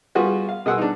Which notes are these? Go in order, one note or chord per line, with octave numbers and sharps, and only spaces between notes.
G3 B3 F4 F#4 G#4
F5
B2 G#4 F#5 C6 E6
D4 D#4